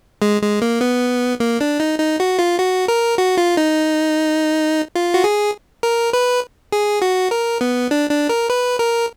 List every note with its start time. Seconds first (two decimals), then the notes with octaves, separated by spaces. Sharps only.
0.22 G#3
0.42 G#3
0.62 A#3
0.81 B3
1.40 A#3
1.61 D4
1.80 D#4
1.99 D#4
2.20 F#4
2.39 F4
2.59 F#4
2.88 A#4
3.18 F#4
3.37 F4
3.57 D#4
4.95 F4
5.14 F#4
5.24 G#4
5.83 A#4
6.13 B4
6.72 G#4
7.02 F#4
7.31 A#4
7.61 B3
7.91 D4
8.10 D4
8.29 A#4
8.50 B4
8.79 A#4